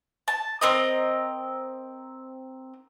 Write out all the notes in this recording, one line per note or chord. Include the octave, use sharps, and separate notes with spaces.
A5
C4 A#4 D#5